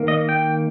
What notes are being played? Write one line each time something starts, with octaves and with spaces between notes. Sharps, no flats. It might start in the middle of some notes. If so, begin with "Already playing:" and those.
Already playing: D#3 A#3
D#5
G5